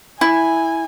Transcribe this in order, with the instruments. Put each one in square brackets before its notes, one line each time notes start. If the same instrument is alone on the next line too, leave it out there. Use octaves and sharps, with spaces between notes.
[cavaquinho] E4 [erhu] G#5